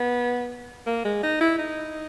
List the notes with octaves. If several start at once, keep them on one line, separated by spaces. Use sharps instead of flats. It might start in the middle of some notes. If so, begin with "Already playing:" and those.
Already playing: B3
A#3
G#3
D#4
E4
D#4